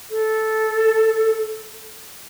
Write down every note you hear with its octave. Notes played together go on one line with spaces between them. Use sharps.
A4